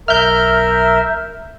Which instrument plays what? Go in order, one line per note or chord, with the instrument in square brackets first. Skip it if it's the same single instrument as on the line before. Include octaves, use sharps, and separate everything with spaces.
[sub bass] B1 [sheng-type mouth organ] A#4 [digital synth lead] E5 [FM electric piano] F6 G6